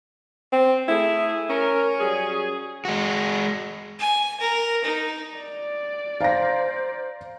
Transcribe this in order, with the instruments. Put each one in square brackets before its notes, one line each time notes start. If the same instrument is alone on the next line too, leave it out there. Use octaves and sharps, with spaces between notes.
[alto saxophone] C4
[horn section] A3 G#4 [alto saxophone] E4
[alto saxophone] C#4 [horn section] A#4
[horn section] F#3 G3 G#4
[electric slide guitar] G#3 F#4
[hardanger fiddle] G#5
A#4
D#4
[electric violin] D5
[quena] C5 [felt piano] F5 A#5 A#6